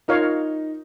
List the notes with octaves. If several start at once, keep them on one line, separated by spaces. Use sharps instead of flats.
D#4 F4 A#4 C#5 F5